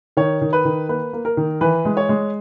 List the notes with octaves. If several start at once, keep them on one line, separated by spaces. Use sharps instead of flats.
D#3 C#5
D#3
B4
D#3
A#3 B4
A#3
A#4
D#3
E3 B4
G#3
C#5
G#3